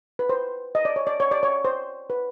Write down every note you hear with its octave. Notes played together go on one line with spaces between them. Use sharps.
B4
C5
D#5
D5
C#5
D5
C#5
D5
C#5
C5
B4